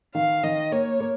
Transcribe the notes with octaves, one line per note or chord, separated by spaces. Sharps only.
D#3 F5
D#3 D#5
A#3 C#5
A#3